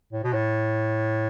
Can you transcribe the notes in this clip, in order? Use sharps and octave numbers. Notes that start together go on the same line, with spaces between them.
A2
B2
A2